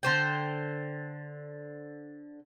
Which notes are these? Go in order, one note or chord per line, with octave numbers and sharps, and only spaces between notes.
D3 C5 G5